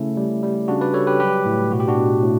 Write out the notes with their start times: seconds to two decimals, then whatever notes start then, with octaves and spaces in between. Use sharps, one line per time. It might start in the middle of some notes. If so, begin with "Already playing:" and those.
Already playing: C#3 A3 C#4 E4
0.17 G3
0.43 G3
0.68 C#3 D4 F#4
0.81 B4 D5
0.94 G3 A4 C#5
1.07 G4 B4
1.20 F#3 G4 B4
1.45 A2
1.71 B2 F#4
1.80 G4
1.88 D4 F#4
1.97 B2
2.23 A2